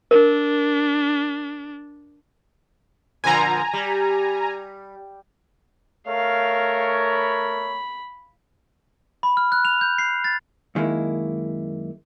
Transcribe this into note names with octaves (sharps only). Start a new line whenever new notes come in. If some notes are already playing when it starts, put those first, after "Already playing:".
D4 A#4
A#2 D3 F3 G#5 A#5
G3
A3 A#4 C#5 F5
B5
B5
F6
F#6
F7
G6
C7
A6
F#2 D#3 G#3 A#3 E4